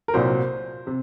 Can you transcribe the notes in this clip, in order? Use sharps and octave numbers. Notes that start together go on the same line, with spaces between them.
A#4
C2 A#2 F#3 C5
C3